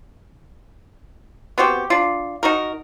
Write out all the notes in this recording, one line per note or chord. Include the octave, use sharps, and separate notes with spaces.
B3 C4 F#4 G4
D4 F4
D#4 F#4 A#4